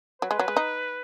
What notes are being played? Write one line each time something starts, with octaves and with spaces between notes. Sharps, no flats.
F#3 B4
G#3
F#3
G#3
D#4